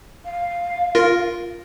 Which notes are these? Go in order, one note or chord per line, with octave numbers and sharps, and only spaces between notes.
F5
F4 A#4 A#6